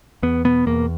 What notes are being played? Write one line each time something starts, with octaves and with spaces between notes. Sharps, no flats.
E2 B3
B2 B3
E2 A#3